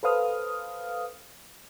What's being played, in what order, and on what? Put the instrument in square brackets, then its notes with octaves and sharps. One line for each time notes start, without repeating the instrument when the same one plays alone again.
[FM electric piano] A4 B4 C5 F5 D#6 F6